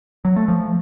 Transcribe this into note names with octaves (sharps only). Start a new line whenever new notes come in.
F#3
A3
F3